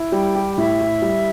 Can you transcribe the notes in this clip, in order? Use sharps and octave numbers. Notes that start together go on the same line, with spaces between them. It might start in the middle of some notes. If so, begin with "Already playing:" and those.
Already playing: E4
G3 G5
G4
A2 E5
E4
G3